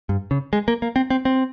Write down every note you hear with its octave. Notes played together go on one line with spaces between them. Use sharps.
G2
C#3
G#3
A#3
A#3
C4
C4
C4